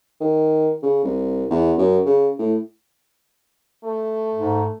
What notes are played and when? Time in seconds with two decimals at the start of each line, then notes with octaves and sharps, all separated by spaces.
0.20 D#3
0.83 C#3
1.04 C2
1.50 E2
1.78 F#2
2.05 C#3
2.39 A2
3.84 A3
4.34 G#2